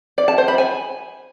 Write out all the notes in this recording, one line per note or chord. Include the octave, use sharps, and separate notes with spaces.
D5
A5
C5
B5
G#5